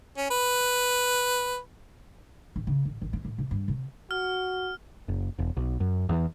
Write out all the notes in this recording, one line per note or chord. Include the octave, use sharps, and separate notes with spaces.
C#4
B4
A1
C#3
A1
A1
C#4
A2
C3
G2
C3
F#4 F6
F#1
E1
B1
F#2
E2